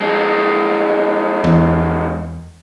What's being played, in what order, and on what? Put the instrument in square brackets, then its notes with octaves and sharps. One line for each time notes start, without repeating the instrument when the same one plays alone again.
[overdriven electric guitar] F2 G#3
[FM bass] E2